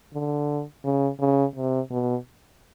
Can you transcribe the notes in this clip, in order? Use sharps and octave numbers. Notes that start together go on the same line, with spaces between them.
D3
C#3
C#3
C3
B2